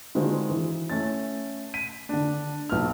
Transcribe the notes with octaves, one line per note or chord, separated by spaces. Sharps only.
D3 D#3 G#3 C4 F4 F#4
E3
A3 C#4 A6
B6 D#7
D3 D4
B1 B3 F6